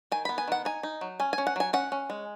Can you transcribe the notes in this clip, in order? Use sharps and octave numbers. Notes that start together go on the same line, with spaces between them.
D#3 G#5
B3 B5
G#5
D#3 F#5
D#4 G#5
D#4
F#3
C#4 G#5
G#5
C#4
F#5
F#3 G#5
C#4 F#5
C#4
G#3